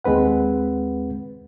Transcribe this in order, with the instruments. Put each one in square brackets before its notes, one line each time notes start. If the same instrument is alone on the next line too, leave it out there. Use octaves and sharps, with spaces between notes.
[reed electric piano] D#2 G#3 C4 B4 F#5